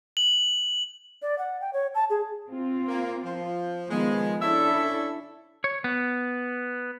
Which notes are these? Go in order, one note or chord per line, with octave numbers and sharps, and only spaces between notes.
F#7
D5
F#5
G5
C#5
A5
G#4
C4 F4
A#3
F3
D#3 F3 G#3 B3
C#4 D4 E4 A4 D5 E5
C#5
B3